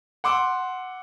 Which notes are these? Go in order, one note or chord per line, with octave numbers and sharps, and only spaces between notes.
F#5 C6 D6 E6